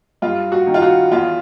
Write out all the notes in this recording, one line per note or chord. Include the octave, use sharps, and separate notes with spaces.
G2 F4
F#4
D#3
F4
F#4
E2 F4